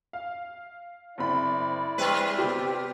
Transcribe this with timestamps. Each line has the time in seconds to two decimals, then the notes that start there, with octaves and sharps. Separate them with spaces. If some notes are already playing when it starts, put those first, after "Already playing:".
0.13 F5
1.18 F#1 C4 E4 D5 B5
1.98 G3 G#3 C4 B4
2.38 C3 B3 G4